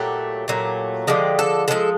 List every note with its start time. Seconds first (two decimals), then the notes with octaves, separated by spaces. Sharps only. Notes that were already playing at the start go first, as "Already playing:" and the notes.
Already playing: A#2 F#3 A3 G4
0.48 A#2 F#3 A3
1.07 D3 F3 G#3 G4
1.39 A4
1.68 D3 F3 G#3 A4